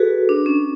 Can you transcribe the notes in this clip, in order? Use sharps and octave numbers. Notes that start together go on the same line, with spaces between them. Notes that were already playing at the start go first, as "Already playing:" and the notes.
Already playing: F#4 G#4 A4 B4
D4
C#4